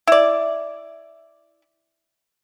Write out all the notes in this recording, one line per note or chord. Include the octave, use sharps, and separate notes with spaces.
E4 D5